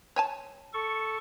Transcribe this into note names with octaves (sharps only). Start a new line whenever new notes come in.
C#5 G#5 A5
A4 C#6